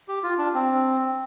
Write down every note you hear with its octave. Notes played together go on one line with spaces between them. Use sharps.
G4
F4
D4
C4